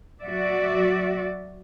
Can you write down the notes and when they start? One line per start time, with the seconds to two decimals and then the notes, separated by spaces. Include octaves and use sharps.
0.23 F#3 F#4 D5 E5